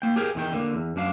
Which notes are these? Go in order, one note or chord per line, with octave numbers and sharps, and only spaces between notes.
A#3 G5
G4 G#4 A#4 G5
E2 D#3 G5
D3 A#3
E2
F#2 D4 F5